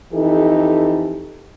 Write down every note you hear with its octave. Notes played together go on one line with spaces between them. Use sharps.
F2 E3 D#4 G4 A4